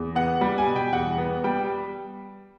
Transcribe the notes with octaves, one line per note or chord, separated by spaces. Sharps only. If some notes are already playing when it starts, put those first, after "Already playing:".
Already playing: E2
B3 F#5
G3
G#5
B2
G5
E2 F#5
B3
G3 G5